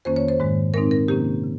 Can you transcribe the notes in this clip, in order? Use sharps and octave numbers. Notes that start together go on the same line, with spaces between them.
F2 D#3 A#3 C#4 C5
C#5
C5
G#2 D#3 G#3
A#2 G#3 C4 D#4 A#4
A#4
C3 D#3 A#3 C#4 G4
C#3